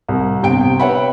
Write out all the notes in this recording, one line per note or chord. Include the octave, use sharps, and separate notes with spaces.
C2
G1 C3 G5 D7
B4 C#5 E5 F#5 G5 B5